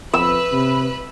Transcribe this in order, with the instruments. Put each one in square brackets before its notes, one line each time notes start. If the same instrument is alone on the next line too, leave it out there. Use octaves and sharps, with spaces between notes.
[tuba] F2 [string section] B4 [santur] E6
[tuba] C3